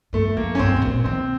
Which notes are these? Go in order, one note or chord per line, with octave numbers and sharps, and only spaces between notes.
G2 A3
F#2 A#3
C#4
G2 C4
B2
A#2
D#3 C4